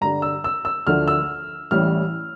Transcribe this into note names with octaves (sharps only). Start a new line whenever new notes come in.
G2 D3 G3 D4 A#5
E6
E6
E6
D2 D3 F3 A3 D4 F6
E6
A1 A2 E3 G3 C#4 F6